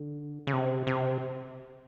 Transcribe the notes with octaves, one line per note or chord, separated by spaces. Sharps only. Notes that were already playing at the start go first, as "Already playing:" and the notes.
Already playing: D3
C#3
C3
C3